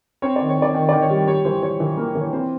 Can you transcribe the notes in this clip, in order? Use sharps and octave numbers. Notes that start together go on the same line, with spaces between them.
C4 C#5
D#3 D5
C#5
D#3 D5
D#3
D#3 D5
C#5
G3
G3 C#5
E3 C5
E3 C#5
E3
A#3
E3
C#5
C4 C5